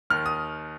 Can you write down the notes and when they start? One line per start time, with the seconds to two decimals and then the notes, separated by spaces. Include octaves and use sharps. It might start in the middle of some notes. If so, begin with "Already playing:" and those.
0.10 D#2 D#3 F6
0.26 D#6